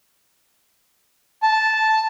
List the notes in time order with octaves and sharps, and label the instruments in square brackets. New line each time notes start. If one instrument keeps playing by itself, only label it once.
[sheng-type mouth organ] A5